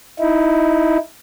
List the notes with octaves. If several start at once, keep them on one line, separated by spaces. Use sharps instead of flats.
D#4 E4